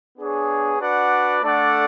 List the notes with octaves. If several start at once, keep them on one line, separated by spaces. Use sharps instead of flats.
B3 D4 G#4 C#5
D4 F#4 B4 D5 F#5
A3 D4 A4 D5 F#5